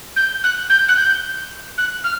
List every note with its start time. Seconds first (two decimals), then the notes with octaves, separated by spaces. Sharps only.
0.16 G6
0.43 F#6
0.69 G6
0.88 F#6
0.96 G6
1.78 F#6
2.04 F6